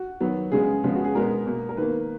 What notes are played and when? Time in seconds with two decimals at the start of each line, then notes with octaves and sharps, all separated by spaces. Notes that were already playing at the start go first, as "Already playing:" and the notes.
Already playing: F#4
0.20 D#3 F#3 B3
0.52 C#3 G#3 B3 G#4
0.84 C#3 F3 G#3 B3
0.95 F#4
1.04 G#4
1.15 B2 G#3 B3 A#4
1.46 B2 A#3
1.69 A#4
1.77 D#3 A#3 B4